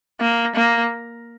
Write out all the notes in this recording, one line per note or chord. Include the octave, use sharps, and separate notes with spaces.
A#3
A#3